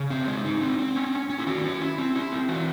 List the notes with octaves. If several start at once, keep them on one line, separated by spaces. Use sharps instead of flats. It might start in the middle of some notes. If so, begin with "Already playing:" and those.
Already playing: C#3
C4
G#3
D#4
C4
C4
C#4
C#4
C#4
E4
D#3 F#4
C#4
E4
C4
E4
C4
E3 F#4